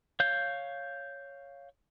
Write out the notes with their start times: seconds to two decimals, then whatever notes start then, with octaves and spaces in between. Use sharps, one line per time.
0.20 C#5 F5 G6